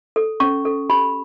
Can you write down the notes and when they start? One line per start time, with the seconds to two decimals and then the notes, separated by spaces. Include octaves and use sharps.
0.16 A4
0.40 C#4 C#6
0.65 A4
0.90 G4 B5